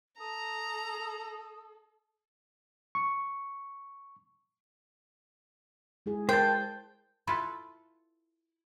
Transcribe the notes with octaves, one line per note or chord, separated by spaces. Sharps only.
A4 A#5 D#6
C#6
G#3 E4 G#4
G#4 A#4 C5 G5 A5
E4 F4 A4 B4